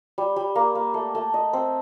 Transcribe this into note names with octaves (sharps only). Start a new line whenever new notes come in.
G3
G3
A#3
A#3
A3
A3
D#5
C4